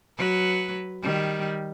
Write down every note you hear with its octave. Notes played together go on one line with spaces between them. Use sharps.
F#3 B4
D#3 G3